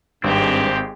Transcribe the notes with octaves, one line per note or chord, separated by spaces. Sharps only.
G#1 G2 G#3 C4 G4